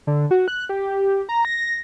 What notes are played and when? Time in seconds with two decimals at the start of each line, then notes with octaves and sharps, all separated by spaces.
0.07 D3
0.31 F#4
0.48 F#6
0.69 G4
1.29 A#5
1.45 A#6